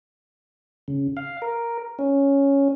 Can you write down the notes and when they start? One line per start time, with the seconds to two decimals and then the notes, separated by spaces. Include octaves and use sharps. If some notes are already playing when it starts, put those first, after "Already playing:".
0.88 C#3
1.17 F5
1.42 A#4
1.99 C#4